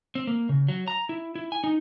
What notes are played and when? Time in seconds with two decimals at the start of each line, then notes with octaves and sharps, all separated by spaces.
0.15 C4
0.27 A#3
0.49 C#3
0.69 F#3
0.88 A#5
1.09 E4
1.35 E4
1.52 G#5
1.64 D#4